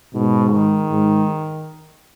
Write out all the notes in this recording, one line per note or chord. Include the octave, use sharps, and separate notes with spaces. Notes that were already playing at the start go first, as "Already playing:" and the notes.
G#2 B2
D#3
G#2